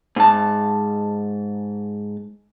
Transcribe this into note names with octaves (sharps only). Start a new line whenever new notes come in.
G#2 A5